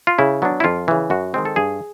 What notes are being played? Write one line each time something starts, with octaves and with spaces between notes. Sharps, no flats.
F4
C#3 E4
F#3 B3 D4
E4
F2 F4
C#3 E3
F#2 F#4
D#3 G#3 C4
A4
G2 G#4